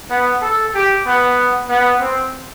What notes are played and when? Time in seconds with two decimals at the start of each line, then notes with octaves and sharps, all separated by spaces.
0.10 B3
0.42 A4
0.75 G4
1.06 B3
1.69 B3
2.00 C4